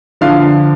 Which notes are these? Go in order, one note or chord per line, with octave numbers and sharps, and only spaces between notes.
D3 F3 F5